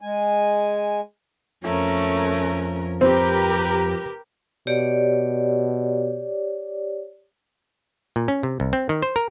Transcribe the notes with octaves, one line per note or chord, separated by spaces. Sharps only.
G#3 G#5
F2 F3 A3 C#4 A#4
C4 G4 A#4 B4 A#5
B2 G4 C#5 D5
A#2
C#4
C3
C2
C4
D#3
C5
A#4